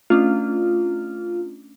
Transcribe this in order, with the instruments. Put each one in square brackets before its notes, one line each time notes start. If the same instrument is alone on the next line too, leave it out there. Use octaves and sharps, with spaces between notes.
[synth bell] A3 C#4 D4 [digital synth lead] F4